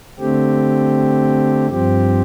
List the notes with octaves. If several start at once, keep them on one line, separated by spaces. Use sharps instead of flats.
D3 A3 C4 G4
G2 F3 C4 G4